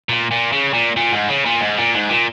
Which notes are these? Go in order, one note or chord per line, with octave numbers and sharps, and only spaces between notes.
A#2
A#2
C#3
A#2
A#2
G#2
C#3
A#2
G#2
A#2
G#2
A#2